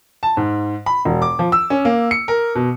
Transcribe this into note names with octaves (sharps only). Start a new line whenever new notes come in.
A5
G#2
B5
E1
D6
F3
E6
C#4
A#3
C#7
A#4
B2